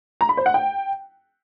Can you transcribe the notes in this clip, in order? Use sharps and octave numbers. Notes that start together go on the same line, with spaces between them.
A#5
B5
C5
F#5
G5